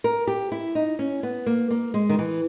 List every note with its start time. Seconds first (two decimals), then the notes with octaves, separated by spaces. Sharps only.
0.04 A#4
0.27 G4
0.52 E4
0.75 D#4
0.99 C#4
1.23 B3
1.46 A#3
1.70 A#3
1.94 G#3
2.09 D#3
2.19 E3